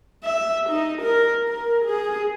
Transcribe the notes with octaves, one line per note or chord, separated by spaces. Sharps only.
E5
D#4
A#4
A#4
G#4